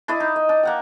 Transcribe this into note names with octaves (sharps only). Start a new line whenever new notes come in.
D4 E4 D5 D#5
D#4
D#5
D4
A#3 F#5 G5